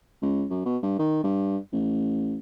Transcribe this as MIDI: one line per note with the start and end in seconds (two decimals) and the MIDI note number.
0.22 0.45 37
0.50 0.63 42
0.65 0.77 47
0.83 0.98 43
0.99 1.23 51
1.23 1.57 43
1.73 2.38 33